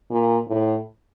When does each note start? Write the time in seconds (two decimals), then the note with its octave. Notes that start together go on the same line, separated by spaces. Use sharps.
0.10 A#2
0.49 A2